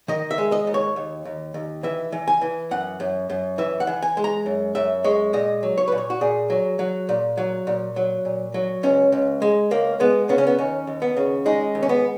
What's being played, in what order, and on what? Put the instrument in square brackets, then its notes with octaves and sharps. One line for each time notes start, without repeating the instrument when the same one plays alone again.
[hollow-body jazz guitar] D#3 D#5
E5
G#3
D#5
D#2
C#5
D#2
D#2
D#2
E3 E5
E3
G#5
E3
F#2 F#5
F#2
F#2
E3 E5
F#5
E3
G#5
G#3
A#5
F#2
F#2 E5
G#3 C#5
A#2 D#5
F#3
C#5
A#2 B4
C#5
F#4
A#2 G#4
F#3
F#3
A#2
F#3
A#2
F#3
A#2
F#3
C#2 C#4
C#2
G#3
C#2 A#3
G#3 B3
C#3 B3
C#4
B3
D#2 C#4
D#2
B3
C#3
G#3 D#4
D#2
C#4
B3